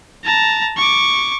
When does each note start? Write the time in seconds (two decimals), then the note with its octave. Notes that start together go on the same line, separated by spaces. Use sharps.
0.24 A5 A#5
0.77 C#6 D6